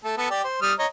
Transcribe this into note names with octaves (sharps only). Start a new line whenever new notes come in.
A3 A4
B3 A4
G4 D5
C5
G3 D#6 F6
C#5 D#5 A#5